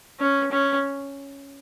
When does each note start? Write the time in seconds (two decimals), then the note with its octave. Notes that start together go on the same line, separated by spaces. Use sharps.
0.19 C#4
0.52 C#4